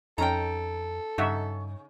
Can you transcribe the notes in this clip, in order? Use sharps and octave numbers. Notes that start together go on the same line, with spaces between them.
F2 C#4 D#4 A4 G5 A#5
G2 C#3 D#4 E5 F#5